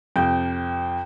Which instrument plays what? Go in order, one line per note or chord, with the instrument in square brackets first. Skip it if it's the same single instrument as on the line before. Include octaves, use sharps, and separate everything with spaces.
[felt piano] F2 C3 [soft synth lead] G5